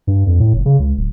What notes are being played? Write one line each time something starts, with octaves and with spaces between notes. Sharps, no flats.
G2
F2
A2
F#1
C#3
C#2
D1